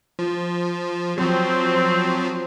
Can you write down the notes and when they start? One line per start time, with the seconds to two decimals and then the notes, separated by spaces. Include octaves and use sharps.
0.19 F3
1.18 F3 F#3 C4